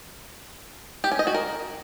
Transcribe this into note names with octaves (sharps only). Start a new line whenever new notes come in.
G4
C#4
D#5
F#4
A#4